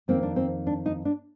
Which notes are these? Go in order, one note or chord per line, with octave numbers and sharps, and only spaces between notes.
F2 D#3 A#3 C4
D4
C4
D4
D#4
D4